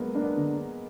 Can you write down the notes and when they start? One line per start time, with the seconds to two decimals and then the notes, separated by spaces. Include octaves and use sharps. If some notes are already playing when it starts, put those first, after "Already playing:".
Already playing: F#3 G#3 A#3 B3
0.15 A#3 D4
0.22 B3
0.36 D3